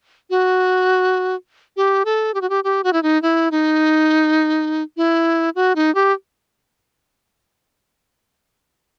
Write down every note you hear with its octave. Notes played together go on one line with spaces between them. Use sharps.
F#4
G4
A4
G4
F#4
G4
G4
F#4
E4
D#4
E4
D#4
E4
F#4
D#4
G4